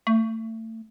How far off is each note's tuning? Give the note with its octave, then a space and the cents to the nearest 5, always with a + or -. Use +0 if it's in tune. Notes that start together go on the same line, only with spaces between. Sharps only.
A3 +30